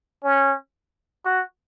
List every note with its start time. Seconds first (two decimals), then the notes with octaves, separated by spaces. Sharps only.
0.24 C#4
1.25 F#4